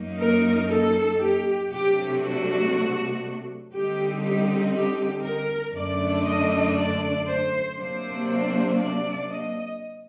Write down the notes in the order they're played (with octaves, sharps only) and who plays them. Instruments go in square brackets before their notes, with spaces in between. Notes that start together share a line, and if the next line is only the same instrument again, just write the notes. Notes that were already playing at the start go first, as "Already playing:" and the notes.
Already playing: [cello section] F#2 F#3 A#3 D#4
A#4
A4
G4
C3 F#3 A3 D4 G4
F#4
D3 G3 C4 D#4 G4
G4
G4
A#4
F#2 D3 A3 D4 D5
D#5
D5
C5
C3 F#3 A#3 D4 C5
C5
D5
D#5